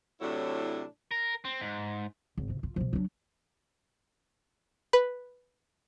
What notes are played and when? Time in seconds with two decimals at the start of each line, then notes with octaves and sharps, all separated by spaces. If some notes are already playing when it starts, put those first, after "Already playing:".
0.21 A2 C3 F#3 D4 E4
1.11 A#4
1.45 C4
1.61 G#2
2.38 G#1
2.49 C3
2.63 F4
2.76 B2 F3
2.93 F#3 D4
4.93 B4